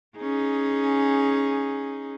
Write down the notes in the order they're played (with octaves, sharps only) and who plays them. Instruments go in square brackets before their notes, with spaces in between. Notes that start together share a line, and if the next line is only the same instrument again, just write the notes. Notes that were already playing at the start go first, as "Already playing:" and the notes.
[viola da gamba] C#4 D#4 G#4